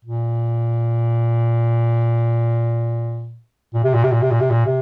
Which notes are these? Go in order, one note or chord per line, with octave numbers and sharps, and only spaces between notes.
A#2
A#2
C3
A#2
C3
A#2
C3
A#2
C3
A#2
C3